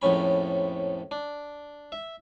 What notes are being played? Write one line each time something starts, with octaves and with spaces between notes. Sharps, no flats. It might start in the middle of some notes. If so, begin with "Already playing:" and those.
A#1 F2 A2 C#4 B5
D4
E5